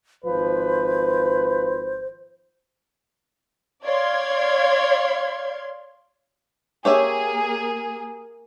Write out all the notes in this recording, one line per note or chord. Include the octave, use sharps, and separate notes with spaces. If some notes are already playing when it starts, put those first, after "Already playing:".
G#1 F3 B4 C5
C#5 D5 F5 C6 G#6
A#3 G4 G#4 C#5 E5